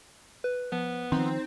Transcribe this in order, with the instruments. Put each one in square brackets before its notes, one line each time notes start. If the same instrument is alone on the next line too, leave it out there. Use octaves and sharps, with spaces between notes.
[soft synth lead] B4
[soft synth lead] F3 [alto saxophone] B3
[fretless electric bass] D#3 F3 [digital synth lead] C4 [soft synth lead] D#4